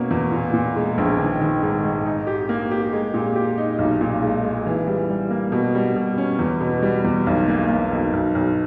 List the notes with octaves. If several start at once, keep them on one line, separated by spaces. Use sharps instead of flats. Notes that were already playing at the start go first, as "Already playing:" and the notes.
Already playing: B2 A#3 C#4
E2
A#2
A#2
G#3
A#1
D#3
D#3
G#2
G#2
D#4
G4
A#3
G4
G#3
A#2
G4
D#4
B1
A#2
G#3
G#3
E3
G3
G3
A#3
B2
G3
B2
C#4
E2
B2
G3
E2
B1
A#3
A#3
B1
B1
B1